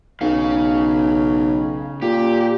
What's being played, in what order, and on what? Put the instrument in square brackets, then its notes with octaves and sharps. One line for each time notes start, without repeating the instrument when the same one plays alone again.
[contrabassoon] B1 [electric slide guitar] C#3 F5
[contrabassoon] A#2 [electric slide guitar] G4